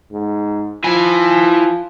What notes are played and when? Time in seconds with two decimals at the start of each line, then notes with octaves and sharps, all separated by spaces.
0.12 G#2
0.84 F3 E4 G#5